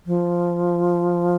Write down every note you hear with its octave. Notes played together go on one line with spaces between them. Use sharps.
F3